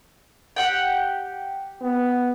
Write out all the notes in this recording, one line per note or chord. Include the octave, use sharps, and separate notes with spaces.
G4 F#5 G5
B3